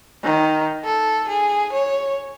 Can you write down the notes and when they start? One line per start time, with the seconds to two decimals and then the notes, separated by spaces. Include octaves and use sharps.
0.24 D#3
0.85 A4
1.29 G#4
1.73 C#5